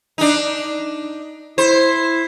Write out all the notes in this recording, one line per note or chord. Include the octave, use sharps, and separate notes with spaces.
D4 D#4
E4 C5